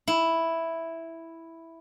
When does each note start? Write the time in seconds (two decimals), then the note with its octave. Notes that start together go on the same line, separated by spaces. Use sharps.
0.08 E4